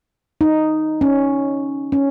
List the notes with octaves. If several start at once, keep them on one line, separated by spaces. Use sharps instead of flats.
D#4
C#4
C#4